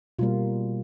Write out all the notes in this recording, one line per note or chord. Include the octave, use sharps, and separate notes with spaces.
B2 G3 A#3 F4